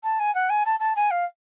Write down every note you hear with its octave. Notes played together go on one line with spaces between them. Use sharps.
A5
G#5
F#5
G#5
A5
A5
G#5
F5